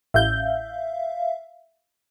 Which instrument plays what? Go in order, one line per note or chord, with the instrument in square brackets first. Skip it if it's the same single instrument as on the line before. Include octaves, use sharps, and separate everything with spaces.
[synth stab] A1 G6 [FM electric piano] E5 F5